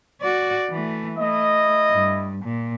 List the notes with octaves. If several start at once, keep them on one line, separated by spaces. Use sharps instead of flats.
F#4 D5
E3 A3
A3 E4 D#5
G2
A#2